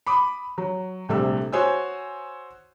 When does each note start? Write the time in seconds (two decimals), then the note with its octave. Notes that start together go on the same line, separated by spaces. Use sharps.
0.06 B5 D6 D#6
0.58 F#3
1.09 A#1 C3 G3 A3 E6
1.52 F#4 C5 C#5 G#5 D#6 E6